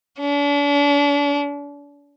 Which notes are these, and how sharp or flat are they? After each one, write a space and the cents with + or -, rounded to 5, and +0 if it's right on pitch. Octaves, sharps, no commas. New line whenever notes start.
D4 -40